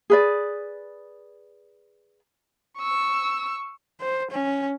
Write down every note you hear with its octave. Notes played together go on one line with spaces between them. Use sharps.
G#4 B4 D5
C#6 E6
C5
C#4